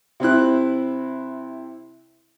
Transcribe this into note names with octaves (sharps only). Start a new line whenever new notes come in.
C3 C4 E4 F#6